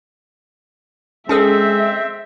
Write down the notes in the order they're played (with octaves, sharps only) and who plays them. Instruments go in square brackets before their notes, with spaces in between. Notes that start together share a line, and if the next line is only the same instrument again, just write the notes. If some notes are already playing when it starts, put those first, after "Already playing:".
[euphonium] G#3 [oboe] C4 [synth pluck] C#4 G#4 A4 [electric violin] E5